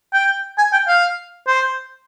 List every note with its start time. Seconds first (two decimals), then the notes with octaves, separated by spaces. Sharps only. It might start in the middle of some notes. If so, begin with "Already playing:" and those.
0.13 G5
0.58 G#5
0.73 G5
0.88 F5
1.47 C5